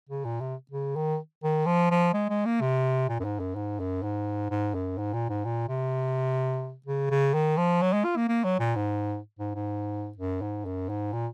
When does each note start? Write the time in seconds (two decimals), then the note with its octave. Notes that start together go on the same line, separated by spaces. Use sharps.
0.09 C#3
0.25 A#2
0.41 C3
0.71 C#3
0.96 D#3
1.43 D#3
1.66 F3
1.91 F3
2.14 G#3
2.30 G#3
2.45 A#3
2.61 C3
3.09 A#2
3.20 F#2
3.24 G#2
3.40 F#2
3.56 G#2
3.80 F#2
4.03 G#2
4.50 G#2
4.74 F#2
4.98 G#2
5.13 A#2
5.29 G#2
5.45 A#2
5.69 C3
6.86 C#3
7.11 C#3
7.34 D#3
7.57 F3
7.82 F#3
7.93 G#3
8.05 F4
8.16 A#3
8.28 A#3
8.44 F#3
8.60 A#2
8.76 G#2
9.39 G#2
9.55 G#2
10.18 F#2
10.42 G#2
10.65 F#2
10.89 G#2
11.13 A#2